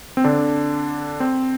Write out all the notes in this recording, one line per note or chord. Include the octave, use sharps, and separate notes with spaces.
C4
D3 D4
C4